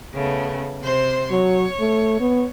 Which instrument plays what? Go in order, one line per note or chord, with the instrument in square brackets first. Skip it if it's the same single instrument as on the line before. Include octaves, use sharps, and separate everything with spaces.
[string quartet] C#3 A3 B3
C3 C5 C6
[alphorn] F#3 [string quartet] C#5
[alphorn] A3
B3